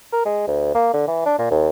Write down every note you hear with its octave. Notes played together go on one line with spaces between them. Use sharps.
A#4
G#3
D2
A#3
D3
E3
D4
A#2
D#2